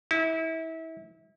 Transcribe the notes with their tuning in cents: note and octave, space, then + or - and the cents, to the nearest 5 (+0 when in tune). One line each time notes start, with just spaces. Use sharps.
E4 -30